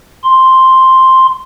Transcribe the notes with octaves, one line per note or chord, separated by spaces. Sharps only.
C6